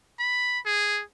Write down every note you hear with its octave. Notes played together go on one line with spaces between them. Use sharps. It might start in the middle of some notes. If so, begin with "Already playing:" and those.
B5
G#4